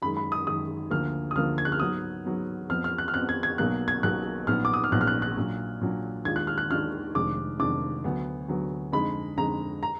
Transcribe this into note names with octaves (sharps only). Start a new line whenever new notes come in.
F#2 D#3 G#3 B5
B5
D#6
F#2 D#3 G#3 D#6
D2 D3 F3 A#3 F6
D#6
D2 D3 F3 A#3 F6
G#6
F#6
F6
G#2 F#3 B3 D#6
G#2 F#3 B3
F2 F3 B3 F6
F6
F#6
F6
F2 F3 B3 F#6
G#6
G#6
B1 B2 F#3 A#3 F#6
G#6
B1 B2 F#3 A#3 F#6
A#1 G#2 F#3 B3 F6
D6
D#6
F6
A#1 G#2 F#3 B3 F#6
F6
F#6
F#6
A#2 F#3 D4
A#2 F#3 D4
D#2 D#3 G#3 D4 F4 G#6
F#6
F6
F#6
D#2 D#3 G#3 D4 F4 F6
F1 F2 D#3 G#3 D4 D6
F1 F2 D#3 G#3 D4 D6
D2 D3 F#3 B3
D2 D3 F#3 B3
F2 D3 G#3 D#4 B5
F2 D3 G#3 D#4 A#5
A#5